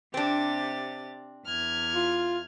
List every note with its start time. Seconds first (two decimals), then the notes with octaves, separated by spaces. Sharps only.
0.14 C3 C4 D4 G4 A6
1.46 E2 F6 G#6
1.95 F4